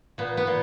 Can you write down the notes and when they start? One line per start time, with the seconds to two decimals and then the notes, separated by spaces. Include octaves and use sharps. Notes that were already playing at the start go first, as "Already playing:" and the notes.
0.18 A#2 B3
0.37 B3
0.47 A#2